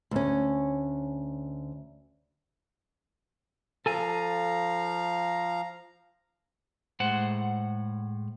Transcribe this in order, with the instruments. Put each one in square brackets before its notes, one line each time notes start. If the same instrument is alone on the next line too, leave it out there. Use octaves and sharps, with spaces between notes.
[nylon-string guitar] D2 C#4
[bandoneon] F3 F5 A#5 [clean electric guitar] A4 G#5
[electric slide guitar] A2 G#3 C5 F#5